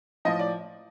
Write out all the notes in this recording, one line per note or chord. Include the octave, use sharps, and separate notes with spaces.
A2 F3 D#5
D5